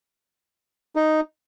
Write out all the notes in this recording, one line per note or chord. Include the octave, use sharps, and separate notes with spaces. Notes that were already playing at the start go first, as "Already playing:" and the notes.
D#4